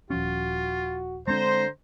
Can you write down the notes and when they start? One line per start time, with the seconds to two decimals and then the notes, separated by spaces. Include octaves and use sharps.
0.10 D#1 F3 C#4 F4 F#4
1.28 D3 G#3 C4 D4 C5 A#5